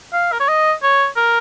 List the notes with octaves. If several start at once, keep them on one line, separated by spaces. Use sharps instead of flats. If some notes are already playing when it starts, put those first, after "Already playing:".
F5
A#4
C#5
D#5
C#5
A#4